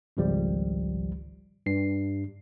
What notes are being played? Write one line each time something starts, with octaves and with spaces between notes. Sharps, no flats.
G#1 C#2 F3 G3
G2 C7